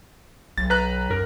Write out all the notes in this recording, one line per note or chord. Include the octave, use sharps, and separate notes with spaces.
B1 A6
B4 A#5 F#6
F#2 A#4